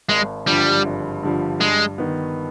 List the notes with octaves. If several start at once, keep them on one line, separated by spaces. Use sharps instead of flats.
G#1 G#3
G2 D3 F3 G3
G#1
G2 D3 F3
G2 G#3
D#3 B3